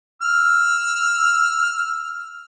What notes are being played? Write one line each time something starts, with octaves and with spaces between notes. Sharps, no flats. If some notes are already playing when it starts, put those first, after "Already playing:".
E6 F6